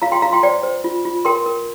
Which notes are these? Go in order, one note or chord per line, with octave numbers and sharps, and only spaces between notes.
F4 F5 A#5
G5 C6
F4 F5 A#5
G5 C6
C5 D5 G5
C5
F4
F4
A#4 G5 C6
A#4